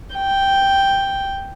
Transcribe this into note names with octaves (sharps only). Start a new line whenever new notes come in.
G5